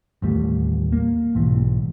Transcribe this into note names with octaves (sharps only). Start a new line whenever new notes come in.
A1 D#2 G3 A3
A#3
B1 G#2 E3